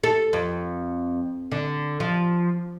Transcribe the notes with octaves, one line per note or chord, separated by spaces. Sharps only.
A4
F2
D3
F3